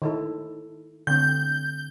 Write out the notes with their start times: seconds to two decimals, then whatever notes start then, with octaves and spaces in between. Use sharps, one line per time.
0.02 D#3 E4 A4
1.07 D3 C4 G6